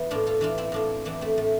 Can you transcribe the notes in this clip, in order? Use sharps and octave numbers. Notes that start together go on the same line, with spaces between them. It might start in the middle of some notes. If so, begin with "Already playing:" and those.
Already playing: E3 B3
A2 D4 F4
F4 A4
E3 D4 F4
C4 E4
A2 D4 F4
E3 B3 D4
A3 C4
A2 A3